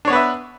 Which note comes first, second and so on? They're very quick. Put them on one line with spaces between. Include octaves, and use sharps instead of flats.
D4 C#5 B3 B4 E5